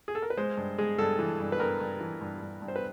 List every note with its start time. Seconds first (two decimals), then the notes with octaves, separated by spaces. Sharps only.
0.08 G#4
0.15 A4
0.22 A#4
0.30 B4
0.37 G#3 C5
0.57 G2
0.78 G#3 G#4
0.98 G2 A4
1.19 E3
1.40 G2
1.52 B4
1.60 G2 A#4
1.80 G2
2.01 E3
2.21 G2
2.42 G2
2.62 G2
2.68 C5
2.76 B4